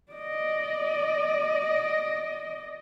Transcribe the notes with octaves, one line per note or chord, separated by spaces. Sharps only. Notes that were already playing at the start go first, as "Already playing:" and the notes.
D5 D#5